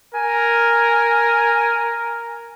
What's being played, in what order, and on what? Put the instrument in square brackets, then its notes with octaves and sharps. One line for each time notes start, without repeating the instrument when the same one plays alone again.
[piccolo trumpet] A#4 [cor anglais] G#5